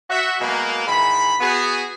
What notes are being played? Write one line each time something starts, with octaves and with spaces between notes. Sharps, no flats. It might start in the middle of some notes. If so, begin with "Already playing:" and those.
F#4 E5
B2 F#3 G#3 A#3
G#2 D#3 E3 B5
B3 F#4 G#4